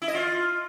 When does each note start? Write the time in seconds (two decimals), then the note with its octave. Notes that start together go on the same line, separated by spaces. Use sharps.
0.02 E4
0.08 D#5
0.14 F4